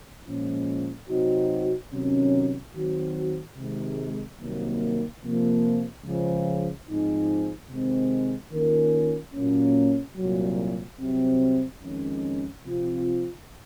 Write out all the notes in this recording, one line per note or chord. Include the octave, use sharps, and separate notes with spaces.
A#2 F3 G#3 C#4
C3 F#3 C4 D#4 F#4
C3 D#3 F#3 C#4
D#3 F#3 C4 F#4
C3 D#3 G#3
C2 C3 D#3 F#3 A#3
C3 F3 A#3
C#2 C#3 F3
G#2 F3 C4 D#4 G#4
C3 D#3 G#3 C4
D#3 A#3 C#4 F4 A#4
A#2 F#3 A#3 C#4
C2 A#2 F#3
C2 C3 F#3 C4
F2 D#3 G#3 C#4
C3 F3 C4 F4